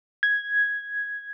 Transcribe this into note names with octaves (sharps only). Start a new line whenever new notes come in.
G#6